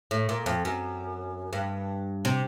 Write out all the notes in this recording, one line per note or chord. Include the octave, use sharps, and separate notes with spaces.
A2
A#2
F2
F#2
G2
C3